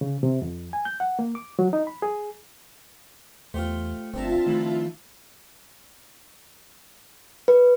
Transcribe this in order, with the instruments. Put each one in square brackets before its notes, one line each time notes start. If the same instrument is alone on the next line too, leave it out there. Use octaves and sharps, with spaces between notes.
[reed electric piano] C#3
C3
F2
G#5
G6
F#5
A#3
D6
F#3
D#4
B5
G#4
[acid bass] E2 [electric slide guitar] A3 [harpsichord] F4 G4 C5
[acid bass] G1 [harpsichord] C4 D4 A#5 [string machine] F4 E5 A5
[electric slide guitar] D#3 F3 E4 [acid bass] A3
[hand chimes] B4